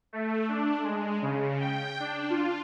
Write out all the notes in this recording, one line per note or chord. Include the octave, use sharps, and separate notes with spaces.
A3
D4
G#3
C#3
G5
D4
F4